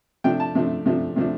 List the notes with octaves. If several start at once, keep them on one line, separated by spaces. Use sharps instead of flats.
C3 F3 A3 D4 G5
A5
C3 F3 A3 D4
C3 F3 A3 D4
C3 F3 A3 D4